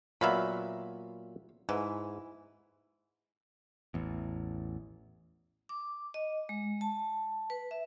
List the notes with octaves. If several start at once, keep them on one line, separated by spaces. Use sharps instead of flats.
A#2 F#3 B3 E5 F5 B5
G#2 E3
A1 E2
D6
D#5
G#3
A5
B4
E5